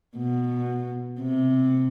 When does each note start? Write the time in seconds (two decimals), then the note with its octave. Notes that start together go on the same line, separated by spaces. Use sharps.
0.17 B2
1.21 C3